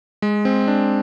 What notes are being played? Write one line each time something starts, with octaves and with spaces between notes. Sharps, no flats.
G#3
C4
D4